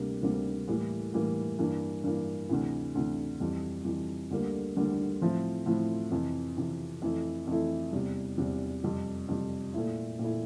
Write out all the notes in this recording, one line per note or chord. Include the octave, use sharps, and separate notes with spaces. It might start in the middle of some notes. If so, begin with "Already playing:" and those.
Already playing: D2 C3 G3 A#3
D2 C3 G3 A#3
A2 E3 G3 A#3
A2 E3 G3 A#3
G2 E3 A#3
G2 E3 A#3
D2 C3 E3
D2 C3 E3
F2 E3 G3
F2 E3 G3
D2 D3 G3 A#3
D2 D3 G3 A#3
A2 F3 C4 E4
A2 F3 C4 E4
F2 C3 E3
F2 C3 E3
F2 E3 A3 E4
F2 E3 A3 E4
E2 C3 G3
E2 C3 G3
F2 C3 G3
F2 C3 G3
A#2 A3 E4
A#2 A3 E4